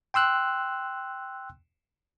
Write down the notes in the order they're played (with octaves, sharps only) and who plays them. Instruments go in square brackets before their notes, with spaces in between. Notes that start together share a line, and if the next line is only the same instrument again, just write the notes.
[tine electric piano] G5 C6 E6 F#6